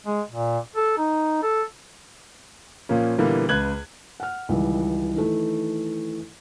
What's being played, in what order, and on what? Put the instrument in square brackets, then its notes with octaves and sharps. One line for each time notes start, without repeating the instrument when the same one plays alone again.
[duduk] G#3
A#2
A4
D#4
A4
[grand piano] A#2 F3 A#3 C#4
A#2 D3 E3 G3 A#3 B3
C#2 B4 F#6 G#6 F#7
[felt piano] F#5 F6
C#2 D#3 E3 G3
D#3 E3 A3